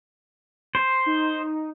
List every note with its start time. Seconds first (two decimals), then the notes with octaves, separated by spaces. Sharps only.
0.75 C5
1.06 D#4